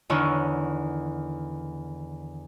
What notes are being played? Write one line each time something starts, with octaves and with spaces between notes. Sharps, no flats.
E2 D3 D#3 C#5 E6